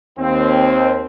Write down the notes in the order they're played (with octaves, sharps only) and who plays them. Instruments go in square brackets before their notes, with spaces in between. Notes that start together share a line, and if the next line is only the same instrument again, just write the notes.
[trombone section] D#2 [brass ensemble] C4